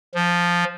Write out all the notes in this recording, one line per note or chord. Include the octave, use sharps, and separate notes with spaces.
F3